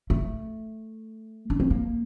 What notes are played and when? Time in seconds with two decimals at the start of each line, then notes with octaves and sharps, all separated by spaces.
0.10 A3
1.50 D4
1.60 C4
1.70 A#3